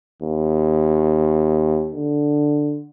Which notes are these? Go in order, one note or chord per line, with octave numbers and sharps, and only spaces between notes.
D#2
D3